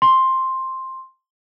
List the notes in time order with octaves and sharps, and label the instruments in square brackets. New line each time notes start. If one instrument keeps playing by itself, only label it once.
[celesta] C6